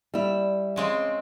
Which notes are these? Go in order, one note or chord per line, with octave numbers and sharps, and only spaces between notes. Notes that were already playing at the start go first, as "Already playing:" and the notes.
G3 E4
C#3 G#3 C4